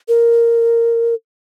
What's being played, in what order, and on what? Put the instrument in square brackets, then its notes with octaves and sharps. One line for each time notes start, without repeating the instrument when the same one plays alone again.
[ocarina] A#4